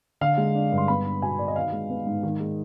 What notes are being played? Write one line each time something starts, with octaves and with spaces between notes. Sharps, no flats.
D3 F5
G#3
D4
G2
C6
B3 B5
D4
B2 G#5
B2 D5
D#5
D#3 F5
G#3
B3
G#2
D#3
G#3